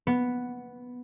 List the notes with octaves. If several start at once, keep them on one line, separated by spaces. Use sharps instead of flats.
B3